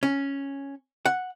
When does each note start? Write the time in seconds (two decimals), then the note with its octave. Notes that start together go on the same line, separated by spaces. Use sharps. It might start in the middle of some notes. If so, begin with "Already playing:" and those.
0.03 C#4
1.06 F#5